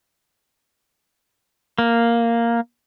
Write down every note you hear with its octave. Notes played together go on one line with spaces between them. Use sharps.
A#3